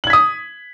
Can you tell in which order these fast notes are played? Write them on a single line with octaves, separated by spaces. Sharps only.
F#7 G#6 B6 D#6